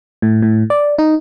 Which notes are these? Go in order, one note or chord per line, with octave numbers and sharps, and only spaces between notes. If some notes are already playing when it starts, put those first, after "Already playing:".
A2
A2
D5
D#4